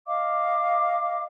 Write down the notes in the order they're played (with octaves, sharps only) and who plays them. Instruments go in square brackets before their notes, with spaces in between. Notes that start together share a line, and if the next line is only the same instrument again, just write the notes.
[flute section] D#5 F5 D6